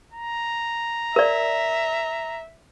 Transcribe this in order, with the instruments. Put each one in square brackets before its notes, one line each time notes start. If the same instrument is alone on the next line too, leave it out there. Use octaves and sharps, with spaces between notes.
[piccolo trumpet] A#5
[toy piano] A#4 D5 [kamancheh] E5